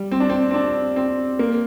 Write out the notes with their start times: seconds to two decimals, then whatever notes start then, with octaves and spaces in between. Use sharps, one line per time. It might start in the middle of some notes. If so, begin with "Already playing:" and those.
Already playing: G3
0.12 C4
0.20 D4
0.30 C4
0.50 C4
0.54 D4
0.96 C4
1.39 A#3